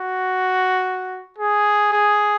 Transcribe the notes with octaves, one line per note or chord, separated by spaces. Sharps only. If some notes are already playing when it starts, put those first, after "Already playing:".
Already playing: F#4
G#4
G#4